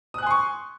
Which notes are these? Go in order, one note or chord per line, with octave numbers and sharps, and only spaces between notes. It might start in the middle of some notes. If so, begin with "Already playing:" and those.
G#5 C6 C#6 D#6 F#6